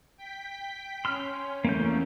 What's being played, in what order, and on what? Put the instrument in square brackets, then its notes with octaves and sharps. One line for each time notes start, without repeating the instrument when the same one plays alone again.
[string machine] G5 B6
[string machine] C#4 [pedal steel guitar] C6 F6
[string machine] E2 A3 [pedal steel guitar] A#3 C#4 G6